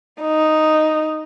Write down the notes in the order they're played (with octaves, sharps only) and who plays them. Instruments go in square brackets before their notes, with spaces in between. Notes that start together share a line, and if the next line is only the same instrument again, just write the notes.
[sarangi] D#4